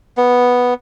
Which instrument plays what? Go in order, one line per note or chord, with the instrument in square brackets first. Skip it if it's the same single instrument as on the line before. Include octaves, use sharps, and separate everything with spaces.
[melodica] B3